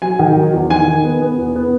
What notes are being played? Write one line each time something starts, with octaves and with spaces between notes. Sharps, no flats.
F#3 G#5
D#3
F#3
E2
D#3 G#5
D#3
B3
B3
E2
B3